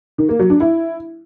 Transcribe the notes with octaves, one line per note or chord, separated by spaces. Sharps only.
D#3
A#3
F#3
D4
E4